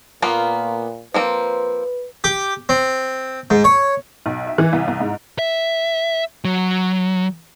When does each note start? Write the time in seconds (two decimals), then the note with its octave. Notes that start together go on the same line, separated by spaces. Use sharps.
0.22 A#2 A#3 B3 F4
1.14 F3 A#3 C4 B4
2.24 G4
2.69 C4
3.50 G#2
3.64 C#5
4.26 B1
4.47 E5
4.58 E3
4.73 C2
4.88 C2
5.00 G#2
5.39 E5
6.45 F#3